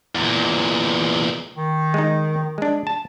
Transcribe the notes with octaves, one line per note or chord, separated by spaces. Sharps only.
E2 A#2
D#3
G#3 D#4
G#3 D4
A5